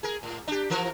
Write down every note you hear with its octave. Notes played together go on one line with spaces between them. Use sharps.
G#4 A#4
A2
D4 G4
E3 F3 A#4